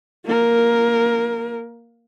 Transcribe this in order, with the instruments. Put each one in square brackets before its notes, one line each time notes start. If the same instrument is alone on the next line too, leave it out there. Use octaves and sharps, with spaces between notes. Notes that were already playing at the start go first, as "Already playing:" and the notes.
[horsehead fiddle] A#3 A#4